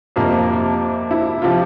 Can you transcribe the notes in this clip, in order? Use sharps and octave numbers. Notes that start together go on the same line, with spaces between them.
F2 C3 F3 A#3
E4
C3 F3 F4